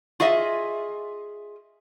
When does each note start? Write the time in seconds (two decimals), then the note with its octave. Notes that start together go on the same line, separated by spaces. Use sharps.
0.20 F4 G#4 D#5 E5